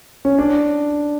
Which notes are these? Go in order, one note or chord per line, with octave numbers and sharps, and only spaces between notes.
C#4
D4